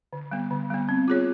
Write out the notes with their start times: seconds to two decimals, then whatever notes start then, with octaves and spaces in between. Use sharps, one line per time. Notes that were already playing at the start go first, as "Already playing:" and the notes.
0.13 D3
0.31 G3 B3
0.51 D3
0.70 G3 B3
0.89 C4
1.08 F4 G#4 C#5